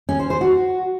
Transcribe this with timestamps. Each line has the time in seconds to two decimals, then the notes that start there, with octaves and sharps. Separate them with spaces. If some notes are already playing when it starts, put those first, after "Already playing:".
0.09 C#4
0.19 C5
0.30 C5
0.41 F#4